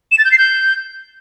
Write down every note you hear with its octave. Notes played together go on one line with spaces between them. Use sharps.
E7
A6
G6
C7
G6